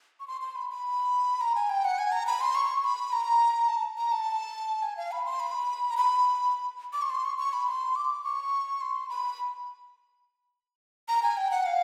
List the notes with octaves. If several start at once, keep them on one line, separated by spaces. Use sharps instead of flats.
C#6
C6
C6
B5
B5
A#5
G#5
G5
F#5
G#5
A#5
B5
C6
C#6
B5
A#5
A5
A#5
A5
G#5
F5
B5
C6
B5
A#5
B5
D6
C#6
C6
C#6
C#6
B5
C6
D6
C#6
C6
B5
A#5
G#5
G5
F#5
F5